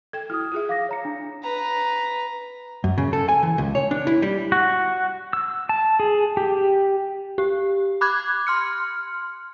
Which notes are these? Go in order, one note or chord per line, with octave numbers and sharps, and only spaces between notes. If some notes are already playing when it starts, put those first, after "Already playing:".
A4 G5 G#6
E4 F#4 D#6 F6
F4 G#4 E5
F5 D6 A#6
C#5 A#5 C#7
D4
B4 A#5
F#2
C#3
A4
G#5
E3
C#2
C#5
D4
E4
G3
F#4
E6
A5
G#4
G4
G4
B5 D6 F#6 G#6
C6 F6 C#7